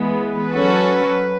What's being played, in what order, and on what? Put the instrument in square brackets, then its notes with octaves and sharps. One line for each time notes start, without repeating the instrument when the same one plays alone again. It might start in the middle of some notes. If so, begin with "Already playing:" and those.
Already playing: [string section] E3 G#3 B3
[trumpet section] B4
[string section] F#3 C#4 F#4 A4